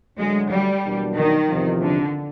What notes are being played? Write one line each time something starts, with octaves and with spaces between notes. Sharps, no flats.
D3 F#3 G#3 A3 D4 F#4
G3
E2 B2 F#3 A#3 D4
D#3
E2 C3 F3
D3